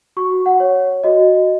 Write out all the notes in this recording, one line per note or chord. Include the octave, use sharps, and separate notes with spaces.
F#4 C#6
F#5
C#5
F#4 D#5